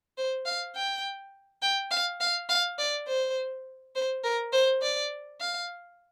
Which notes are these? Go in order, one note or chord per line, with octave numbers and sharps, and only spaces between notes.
C5
F5
G5
G5
F5
F5
F5
D5
C5
C5
A#4
C5
D5
F5